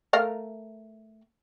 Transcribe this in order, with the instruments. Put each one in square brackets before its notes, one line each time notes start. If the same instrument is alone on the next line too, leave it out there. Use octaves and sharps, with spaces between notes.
[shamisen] A3 A#4 F5